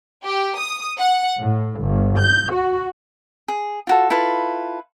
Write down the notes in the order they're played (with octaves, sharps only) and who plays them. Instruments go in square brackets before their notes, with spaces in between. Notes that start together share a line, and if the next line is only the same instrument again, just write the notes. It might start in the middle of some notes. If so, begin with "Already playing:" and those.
[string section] G4
D#6
F#5
A2
G1
G6
F#4
[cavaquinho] G#4
F4 F#4 A4
E4 F4 A4 B4